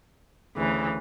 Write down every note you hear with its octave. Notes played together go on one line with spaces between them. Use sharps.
D2 C#3 E3